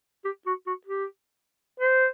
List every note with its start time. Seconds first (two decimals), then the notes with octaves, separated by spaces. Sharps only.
0.25 G4
0.46 F#4
0.67 F#4
0.86 G4
1.80 C5